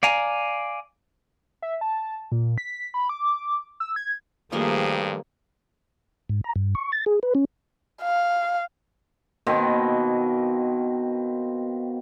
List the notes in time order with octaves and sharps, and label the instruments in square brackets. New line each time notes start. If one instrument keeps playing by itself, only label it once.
[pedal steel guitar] D5 F5 G#5 A#5
[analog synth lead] E5
A5
A#2
B6
B5
D6
E6
G#6
[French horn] G2 [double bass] D#3 G3 [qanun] F3 A3 A#3 [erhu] G#4
[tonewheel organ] G#2
A#5
G2
C#6
A6
G#4
B4
C#4
[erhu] F5
[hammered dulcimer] B2 D#3 A#3 C4